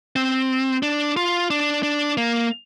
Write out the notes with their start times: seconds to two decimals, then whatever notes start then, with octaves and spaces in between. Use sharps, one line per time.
0.16 C4
0.83 D4
1.17 F4
1.50 D4
1.83 D4
2.17 A#3